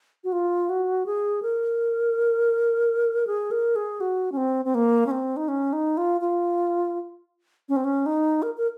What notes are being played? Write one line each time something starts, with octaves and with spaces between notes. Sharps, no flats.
F#4
F4
F#4
G#4
A#4
G#4
A#4
G#4
F#4
C#4
C4
C4
A#3
C#4
C4
D#4
C#4
D#4
F4
F4
C#4
C4
C#4
D#4
A#4
A#4